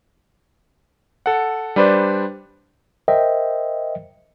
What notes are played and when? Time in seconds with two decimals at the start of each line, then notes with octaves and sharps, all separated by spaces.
1.26 A4 F#5
1.76 G3 D4 B4 C5 D5
3.08 A#4 C5 D#5 E5 G5